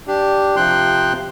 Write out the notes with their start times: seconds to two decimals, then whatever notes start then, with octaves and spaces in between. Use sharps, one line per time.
0.08 D4 G4
0.56 C3 F3 G5 C6 F#6